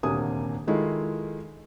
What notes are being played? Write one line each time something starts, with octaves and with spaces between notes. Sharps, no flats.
D#1 D2 C3 A#3 G#5 D#6
D#3 G#3 E4 F4 A4